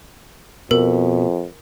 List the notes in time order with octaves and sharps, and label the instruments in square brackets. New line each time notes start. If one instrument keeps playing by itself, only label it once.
[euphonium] F2 [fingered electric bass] B2 [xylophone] A#4